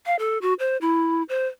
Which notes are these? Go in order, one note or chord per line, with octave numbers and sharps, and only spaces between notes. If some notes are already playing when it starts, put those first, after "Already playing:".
F5
A4
F#4
C5
E4
C5